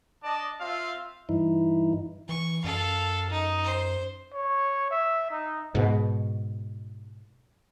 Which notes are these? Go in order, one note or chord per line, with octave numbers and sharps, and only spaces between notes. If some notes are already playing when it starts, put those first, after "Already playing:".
D4 D5 D#5 A5
C4 F4 E5 F5
G2 E3 D#4 E4
E3 C#6
F#2 A4 F5
D#4
C5
C#5
E5
D#4
G#2 B2